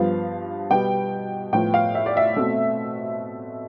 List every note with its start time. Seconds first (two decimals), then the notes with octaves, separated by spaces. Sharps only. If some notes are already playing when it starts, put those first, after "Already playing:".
Already playing: G2 F3 B3 F5
0.70 B2 G3 B3 G5
1.53 A2 F3 B3 G5
1.74 F5
1.95 E5
2.06 D5
2.17 E5
2.36 B2 A3 C4